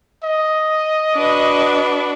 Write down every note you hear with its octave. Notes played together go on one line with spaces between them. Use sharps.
D#5
D4 F#4 B4